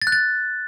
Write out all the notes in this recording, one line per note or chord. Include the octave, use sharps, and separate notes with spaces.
A6
F#6
A6